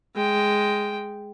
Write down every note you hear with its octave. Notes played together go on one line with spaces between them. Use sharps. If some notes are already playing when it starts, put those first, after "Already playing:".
G#3 G5